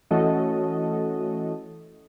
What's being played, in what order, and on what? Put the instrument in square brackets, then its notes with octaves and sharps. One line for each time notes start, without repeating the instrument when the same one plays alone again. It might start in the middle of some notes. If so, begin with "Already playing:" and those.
[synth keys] E3 A3 C#4 F#4 A4 D#5